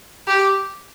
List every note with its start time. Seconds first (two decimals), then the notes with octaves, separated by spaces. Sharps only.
0.28 G4